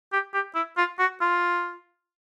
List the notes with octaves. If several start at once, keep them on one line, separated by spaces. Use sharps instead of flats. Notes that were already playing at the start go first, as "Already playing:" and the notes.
G4
G4
E4
F4
F#4
F4